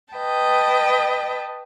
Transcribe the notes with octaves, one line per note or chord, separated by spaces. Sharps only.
B4 D#5 G5 A5